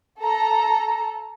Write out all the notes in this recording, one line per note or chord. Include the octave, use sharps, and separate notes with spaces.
A4 A#5